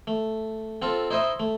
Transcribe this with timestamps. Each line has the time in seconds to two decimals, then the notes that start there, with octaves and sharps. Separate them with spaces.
0.07 A3
0.82 C4 F4 A4
1.11 D#4 E4 C5 D#5 E5
1.40 A3